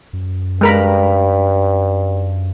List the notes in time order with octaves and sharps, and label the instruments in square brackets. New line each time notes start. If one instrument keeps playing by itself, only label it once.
[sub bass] F#2
[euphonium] G2 [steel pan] G#3 A#4 B5